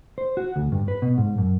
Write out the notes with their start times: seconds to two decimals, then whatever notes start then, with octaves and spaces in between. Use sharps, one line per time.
0.18 C5
0.37 F#4
0.56 D2
0.72 G2
0.88 B4
1.02 B2
1.18 G#2
1.38 F#2